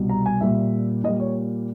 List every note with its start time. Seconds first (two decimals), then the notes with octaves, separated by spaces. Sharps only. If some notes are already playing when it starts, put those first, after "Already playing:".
Already playing: C2 B2 G3
0.09 A#5
0.26 G#5
0.41 A#2 G3 E5
1.04 A#2 G3 D#5
1.20 C#5